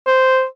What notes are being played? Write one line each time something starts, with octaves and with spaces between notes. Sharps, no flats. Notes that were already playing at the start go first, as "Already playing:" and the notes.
C5